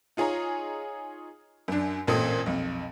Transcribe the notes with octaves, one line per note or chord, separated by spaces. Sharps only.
D#4 F4 G#4 C#5 A#5
F#2 D4
A1 A#2 C4 A4 D#6
B1 F2